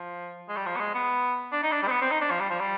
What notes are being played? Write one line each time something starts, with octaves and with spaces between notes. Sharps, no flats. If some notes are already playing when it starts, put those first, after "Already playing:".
Already playing: F3
G#3
G3
F3
B3
G#3
B3
D4
D#4
D4
G3
C4
B3
C4
D#4
D4
F3
G3
F3
G3